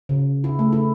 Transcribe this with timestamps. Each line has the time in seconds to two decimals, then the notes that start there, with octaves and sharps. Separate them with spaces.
0.09 C#3
0.44 E4
0.59 A3
0.73 E4